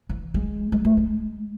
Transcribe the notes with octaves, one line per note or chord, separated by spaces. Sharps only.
E3
G#3
G#3
A3
G#3